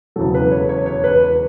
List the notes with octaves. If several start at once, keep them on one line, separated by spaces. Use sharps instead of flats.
E1 E2 C#3 F#3 A4
B4
C#5
C#5
C#5
B4